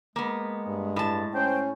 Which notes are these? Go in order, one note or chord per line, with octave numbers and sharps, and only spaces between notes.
G#3 A#3 B3
G2
A2 A5
C#4 C5 G5